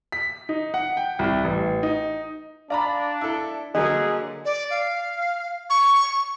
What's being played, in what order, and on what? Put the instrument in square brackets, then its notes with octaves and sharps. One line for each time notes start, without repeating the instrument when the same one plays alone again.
[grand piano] B6
D#4
F#5
G5
C2
A1
D#4
[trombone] D4 [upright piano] D5 A#5 B5 [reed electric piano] F5
[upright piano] E4 A4
[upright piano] D3 F#3 A#3 [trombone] G#4 [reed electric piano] D#5
[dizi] D5
F5
C#6